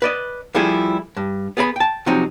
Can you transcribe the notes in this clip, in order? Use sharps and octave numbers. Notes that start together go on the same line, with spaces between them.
B4 D5 D#5
F3 G3 A3 E4 G#4
G2
B3 G#4 D5 B5
G5 A5
C3 F3 F#3 C4 D#4